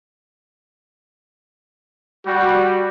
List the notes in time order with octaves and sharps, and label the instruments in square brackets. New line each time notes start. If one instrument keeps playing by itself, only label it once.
[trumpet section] G3 [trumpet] F#4